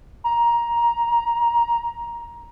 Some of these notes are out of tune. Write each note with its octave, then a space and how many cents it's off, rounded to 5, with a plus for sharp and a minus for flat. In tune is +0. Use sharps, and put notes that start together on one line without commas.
A#5 +15